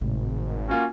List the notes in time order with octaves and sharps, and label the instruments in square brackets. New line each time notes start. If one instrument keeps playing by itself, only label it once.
[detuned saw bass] G#1 [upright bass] A2 C3
[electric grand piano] A#3 F4 F#4 [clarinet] C#4